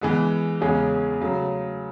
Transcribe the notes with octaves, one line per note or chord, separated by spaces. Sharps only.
E3 G#3 B3
E2 C#3 G#3 C#4 G#4
C#3 F#3 A3